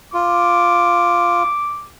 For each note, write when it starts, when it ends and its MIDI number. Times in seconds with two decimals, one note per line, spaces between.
0.14 1.43 65
0.14 1.89 86